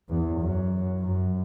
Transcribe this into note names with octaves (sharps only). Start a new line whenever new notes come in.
E2
F#2
F#2